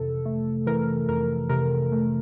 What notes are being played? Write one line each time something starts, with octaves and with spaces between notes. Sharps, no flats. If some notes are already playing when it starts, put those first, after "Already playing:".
Already playing: F2 C3 E3 A4
A3
E3 A#4
F2 A#4
C3 A#4
A3